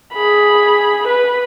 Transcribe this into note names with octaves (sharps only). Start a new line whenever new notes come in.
G#4 B5
B4